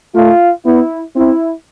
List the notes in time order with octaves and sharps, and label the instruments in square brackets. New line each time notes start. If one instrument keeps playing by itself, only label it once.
[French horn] A3 [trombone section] F4
[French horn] B3 [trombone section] E4
[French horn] C4 [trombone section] E4